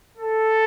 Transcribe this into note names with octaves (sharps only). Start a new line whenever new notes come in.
A4